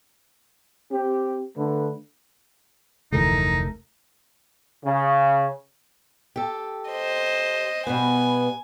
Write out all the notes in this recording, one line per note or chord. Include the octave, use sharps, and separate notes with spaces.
C4 G4
D3 A3 B4
F1 D2 E3 A3 D#4 A#4
C#3
G4 A4
C5 D#5
B2 G3 B3 G#5